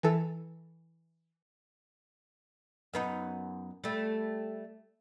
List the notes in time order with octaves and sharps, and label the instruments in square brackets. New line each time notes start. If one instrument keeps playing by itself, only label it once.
[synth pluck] E3 A4
[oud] F#2 B3 D#4
G3 A3